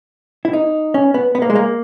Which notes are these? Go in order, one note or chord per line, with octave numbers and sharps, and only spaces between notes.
E4
D#4
C#4
B3
B3
A#3
G#3
A#3